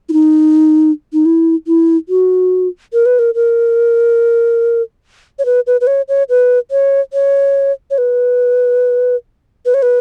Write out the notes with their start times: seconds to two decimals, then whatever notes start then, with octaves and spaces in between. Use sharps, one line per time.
0.09 E4
0.13 D#4
1.13 D#4
1.25 E4
1.67 E4
2.09 F#4
2.93 A#4
3.06 B4
3.19 A#4
3.35 A#4
5.39 C#5
5.45 B4
5.67 B4
5.81 B4
5.87 C#5
6.08 C#5
6.29 B4
6.71 C#5
7.13 C#5
7.91 C#5
7.98 B4
9.66 B4
9.74 C#5
9.82 B4